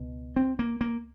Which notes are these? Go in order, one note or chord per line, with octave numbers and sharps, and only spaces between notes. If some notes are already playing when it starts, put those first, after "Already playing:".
Already playing: C#2 B2
C4
A#3
A#3